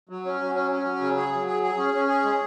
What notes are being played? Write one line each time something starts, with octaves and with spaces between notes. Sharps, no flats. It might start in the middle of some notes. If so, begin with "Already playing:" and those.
F#3
C#4
F#3
C#4
C#4
F#3
C#3
G#4
F#3
G#4
G#4
C#4
C#4
G#4
G#3